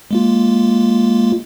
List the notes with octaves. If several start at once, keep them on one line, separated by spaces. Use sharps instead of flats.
G#3 A#3 F4